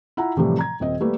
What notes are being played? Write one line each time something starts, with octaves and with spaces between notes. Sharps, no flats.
E4 F4 F#5 A#5
A2 C3 E3 F3 G3
A#5 G#6
D#1 C4 D#5
G3 A3 A#3 B4